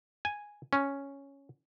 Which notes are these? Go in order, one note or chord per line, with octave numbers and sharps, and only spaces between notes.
G#5
C#4